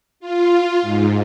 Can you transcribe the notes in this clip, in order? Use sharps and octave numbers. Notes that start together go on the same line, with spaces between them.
F4
G#2